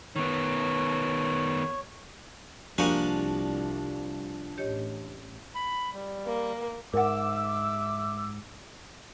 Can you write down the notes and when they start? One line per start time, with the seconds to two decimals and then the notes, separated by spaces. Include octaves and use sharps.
0.16 D#3 B3 C#5
2.78 C2 F3 A#3 D4 F#4 G4 A#4 G#5
4.58 A1 G4 C#5 D#5
5.55 B5
5.93 G3
6.27 A#3
6.94 G#2 A#4 E5 F#5 D6 E6